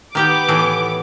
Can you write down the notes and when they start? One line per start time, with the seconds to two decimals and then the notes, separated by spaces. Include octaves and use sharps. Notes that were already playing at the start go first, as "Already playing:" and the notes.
0.15 D#3 B3 G4 G5 D6
0.49 A2 E3